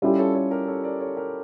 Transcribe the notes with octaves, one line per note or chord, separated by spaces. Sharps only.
G3 C#4 E4 F4 G4 A4
A4 C#5
A4 C#5
G4 A#4
A4 C#5
A#4 D5
A4 C#5
G4 A#4